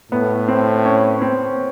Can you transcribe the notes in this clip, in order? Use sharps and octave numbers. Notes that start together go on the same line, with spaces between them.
A2 B3
C4
C#4
C4